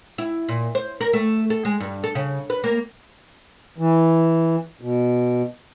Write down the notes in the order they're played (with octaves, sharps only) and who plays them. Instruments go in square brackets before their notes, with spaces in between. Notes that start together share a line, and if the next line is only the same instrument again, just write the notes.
[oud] E4
A#2
C5
A#4
A3
A4
G#3
G2
A4
C#3
B4
A#3
[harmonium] E3
B2